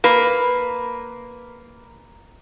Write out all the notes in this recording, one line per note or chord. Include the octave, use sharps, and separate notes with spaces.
A#3 B4